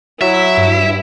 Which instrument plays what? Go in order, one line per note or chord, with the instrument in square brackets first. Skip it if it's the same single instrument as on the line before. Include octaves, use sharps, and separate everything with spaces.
[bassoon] F#3 [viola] E4 [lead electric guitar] E5
[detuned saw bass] G2